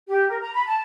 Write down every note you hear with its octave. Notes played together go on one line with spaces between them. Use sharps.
G4
A#4
A#5
B5
A5